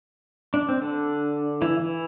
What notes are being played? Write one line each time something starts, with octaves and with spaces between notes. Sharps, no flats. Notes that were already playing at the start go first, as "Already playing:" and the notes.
D4
C4
D3 D4
E3 E4
E3 E4